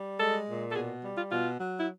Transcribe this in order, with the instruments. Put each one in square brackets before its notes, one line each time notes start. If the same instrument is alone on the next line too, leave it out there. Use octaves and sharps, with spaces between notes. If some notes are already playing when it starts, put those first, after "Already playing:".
Already playing: [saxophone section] G3
G#3 A4
A#2
A4
B2 G#4
G3
F4
B2 F4
F#3
E4